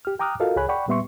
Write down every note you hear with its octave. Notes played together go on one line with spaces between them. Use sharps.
G4 F6
G5 A#5 D6 D#6 F6 F#6
F4 F#4 A4 A#4 D#5 F5
C#2 G#4 C#5 G#5 B5 F#6
D5 F#5 G5 B5 C#6
A#2 G3 B3 E5 C6 C#6